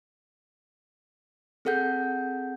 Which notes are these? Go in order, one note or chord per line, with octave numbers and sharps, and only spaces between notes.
C4 G#4 A4 F#5 G6